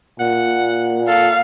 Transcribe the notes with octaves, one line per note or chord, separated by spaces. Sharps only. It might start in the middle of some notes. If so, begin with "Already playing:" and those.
A#2 F#5
A4 F5